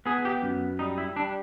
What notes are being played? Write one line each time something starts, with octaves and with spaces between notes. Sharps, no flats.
B3 G#4
G4
F#2
G3 D#4
E4
G3 D4